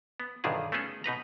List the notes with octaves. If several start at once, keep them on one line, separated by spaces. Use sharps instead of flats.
B3
B1 G2 D3 D#3 F4 G#4
A3 B3 C#4 G#4 A4
B2 D#4 B4 A#5